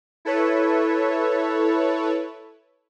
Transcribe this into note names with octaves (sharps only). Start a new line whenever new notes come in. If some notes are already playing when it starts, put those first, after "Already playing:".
E4 A4 B4 C#5